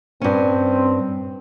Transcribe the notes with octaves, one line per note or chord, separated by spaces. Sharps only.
G2 C4 C#4